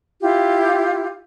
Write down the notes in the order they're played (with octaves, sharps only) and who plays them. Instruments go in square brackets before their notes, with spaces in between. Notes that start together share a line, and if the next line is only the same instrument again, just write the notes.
[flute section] E4 F4 G4